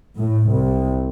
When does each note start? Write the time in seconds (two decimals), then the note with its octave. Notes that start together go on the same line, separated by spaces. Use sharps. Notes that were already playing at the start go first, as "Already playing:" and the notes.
0.18 A2
0.50 C2